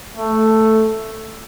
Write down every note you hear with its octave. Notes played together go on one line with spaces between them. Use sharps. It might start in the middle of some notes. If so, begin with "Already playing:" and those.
A3